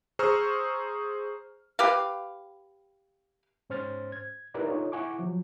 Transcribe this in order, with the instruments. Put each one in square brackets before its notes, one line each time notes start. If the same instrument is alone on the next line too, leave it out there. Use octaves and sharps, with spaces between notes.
[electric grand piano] G#4 C5 A#5 C#6 E6 F6
[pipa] G4 B4 F5
[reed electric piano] G#2 C#4 C5 F6 A6
G#6
D#4 E4 G4 A#4 B4 D5
D4 D#4 F4 A4 C#5
E4 F#5 G#5 C#6 D6
F3 F#3